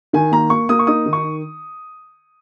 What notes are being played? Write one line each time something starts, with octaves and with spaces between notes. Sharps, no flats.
D#3 G#5
A#3 A#5
A#3 C#6
A#3 D#6
C#6
D#4 D#6
D#3
C#6